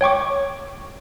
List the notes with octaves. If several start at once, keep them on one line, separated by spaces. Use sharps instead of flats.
C#5 G5 C#6 D6